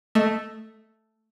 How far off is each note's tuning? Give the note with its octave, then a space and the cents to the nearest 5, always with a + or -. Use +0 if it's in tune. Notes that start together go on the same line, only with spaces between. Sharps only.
A3 +0 D#5 +0